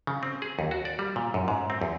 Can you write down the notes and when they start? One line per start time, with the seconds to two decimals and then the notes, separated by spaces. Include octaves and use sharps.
0.07 C#3
0.23 C4
0.42 G#4
0.59 D#2
0.71 F#4
0.85 D5
0.99 G3
1.16 A#2
1.34 F#2
1.48 G#2
1.70 C4
1.81 E2